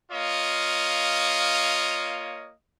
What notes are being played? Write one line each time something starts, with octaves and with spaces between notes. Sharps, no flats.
A#3 F4 C#5 D#5